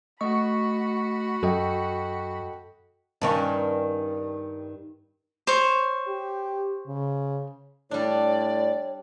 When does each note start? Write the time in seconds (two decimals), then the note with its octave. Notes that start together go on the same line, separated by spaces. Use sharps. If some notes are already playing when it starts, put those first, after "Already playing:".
0.21 A3 F#4 D#5 B5 C#6
1.43 F#2 A4 D#5 G5
3.22 G2 D#3 C#4
5.47 C5 C#5
6.08 G4
6.87 C#3
7.91 A2 G3 D4 C#5 D5